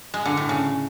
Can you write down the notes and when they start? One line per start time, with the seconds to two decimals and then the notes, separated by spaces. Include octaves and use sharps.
0.14 G#3
0.25 D3
0.37 A2
0.49 C#3